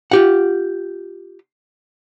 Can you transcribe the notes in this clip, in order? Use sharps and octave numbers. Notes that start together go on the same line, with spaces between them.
F4 G4 F#5